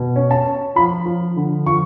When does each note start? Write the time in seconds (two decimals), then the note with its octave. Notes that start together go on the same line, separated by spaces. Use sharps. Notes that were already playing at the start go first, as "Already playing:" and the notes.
Already playing: B2
0.16 C#4
0.31 A5
0.46 C#4
0.76 F3 B5
1.05 F3
1.36 D3
1.66 F3 C#6